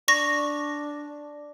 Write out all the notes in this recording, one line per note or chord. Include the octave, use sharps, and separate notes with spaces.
D4 C#6 A#6